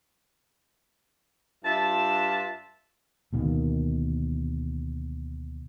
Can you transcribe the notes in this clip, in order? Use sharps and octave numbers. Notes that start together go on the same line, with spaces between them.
G2 F4 E5 A5
D2 B2 D#3 A#3